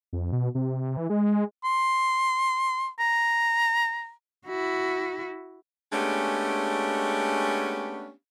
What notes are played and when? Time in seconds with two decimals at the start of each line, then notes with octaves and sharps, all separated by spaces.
0.13 F2
0.32 B2
0.55 C3
0.97 E3
1.10 G#3
1.64 C6
2.99 A#5
4.46 E4 F#4
5.93 G#3 A3 B3 C#4 D4 G4